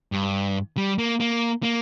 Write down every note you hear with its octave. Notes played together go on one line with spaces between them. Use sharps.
G2
G3
A#3
A#3
A#3